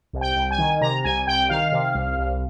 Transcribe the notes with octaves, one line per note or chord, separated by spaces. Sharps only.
C2
G5
C2
G#5
D#3
C3 A#5
C2 G#5
C2 G5
D#3 F5
C3
C2
C2